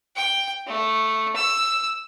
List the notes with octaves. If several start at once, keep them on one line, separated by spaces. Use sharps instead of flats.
G5
A3
E6